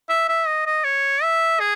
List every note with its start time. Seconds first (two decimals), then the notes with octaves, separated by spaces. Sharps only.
0.09 E5
0.29 E5
0.47 D#5
0.66 D#5
0.84 C#5
1.23 E5
1.60 G#4